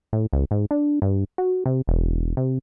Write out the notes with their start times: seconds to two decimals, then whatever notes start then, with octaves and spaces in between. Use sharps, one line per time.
0.13 A2
0.33 C#2
0.51 G#2
0.71 D4
1.02 G2
1.38 F#4
1.66 C3
1.87 E1
2.37 C3